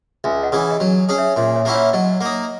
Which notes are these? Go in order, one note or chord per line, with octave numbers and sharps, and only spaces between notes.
C#2 E5 G#5
D#5 F#5
C#3 E3
D#5
F#3 C#5
C#4 G#4
C#5 E5
A#2 C#5 E5
C#5 E5
A#3 C#4 E4 F#5
C#5 E5
F#3 D#5
A#3 D#4